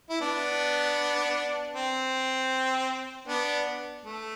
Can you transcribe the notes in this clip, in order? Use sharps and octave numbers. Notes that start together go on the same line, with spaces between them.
E4
B3 D4
C4
B3 D4
A3